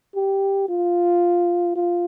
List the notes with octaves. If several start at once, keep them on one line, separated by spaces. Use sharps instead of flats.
G4
F4
F4